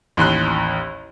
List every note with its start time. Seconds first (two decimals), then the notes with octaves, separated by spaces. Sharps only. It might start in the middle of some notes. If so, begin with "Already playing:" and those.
0.17 A1 D#2 C6 F#6